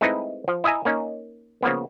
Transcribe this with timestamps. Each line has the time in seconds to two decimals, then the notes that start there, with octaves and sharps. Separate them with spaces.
0.01 G#3 A3 C4 D#4 E4 B4
0.48 F3
0.64 E4 D#5 E5 G#5 A#5
0.85 A#3 C#4 D#4
1.63 C#3 F3 A#3 B3